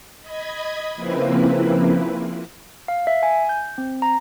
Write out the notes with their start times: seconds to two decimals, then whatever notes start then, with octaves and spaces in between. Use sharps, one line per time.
0.21 D#5 B5 G#6
0.95 C#3 F3 A#3 C4 E4 B4
2.88 F5
3.07 E5
3.23 G#5
3.49 G6
3.78 C4
4.02 A#5